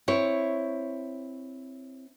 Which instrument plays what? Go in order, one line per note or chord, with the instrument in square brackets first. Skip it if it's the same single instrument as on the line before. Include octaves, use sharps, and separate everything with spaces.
[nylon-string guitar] C4 E4 C#5